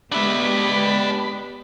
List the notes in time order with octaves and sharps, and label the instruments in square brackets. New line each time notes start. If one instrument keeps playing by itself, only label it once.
[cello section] G#3 B3 G4 [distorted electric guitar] D4 E5 [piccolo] B5